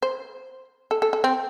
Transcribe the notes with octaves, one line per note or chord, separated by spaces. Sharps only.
C5
A4
A4
A4
C4